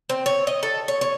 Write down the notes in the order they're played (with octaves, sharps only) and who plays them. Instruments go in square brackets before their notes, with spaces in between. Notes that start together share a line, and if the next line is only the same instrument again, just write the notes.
[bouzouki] C4
C#5
D#5
A4
C#5
C#5